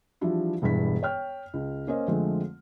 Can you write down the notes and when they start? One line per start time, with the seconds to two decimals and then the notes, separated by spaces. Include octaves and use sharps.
0.21 E3 F3 G3 D4 E4 F#4
0.62 E1 G2 E3 B6
1.03 C#5 G5 F6
1.54 C#2
1.87 A#3 C#4 C5 D#5
2.08 F2 D3 F3 G#3 A3 C4